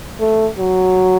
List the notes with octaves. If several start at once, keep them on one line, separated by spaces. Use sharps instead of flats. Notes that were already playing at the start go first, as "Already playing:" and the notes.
A3
F#3